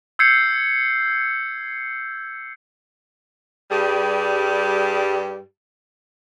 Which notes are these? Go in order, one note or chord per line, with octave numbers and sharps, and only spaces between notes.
E6 G6 G#6 C7 C#7
G2 G3 G4 G#4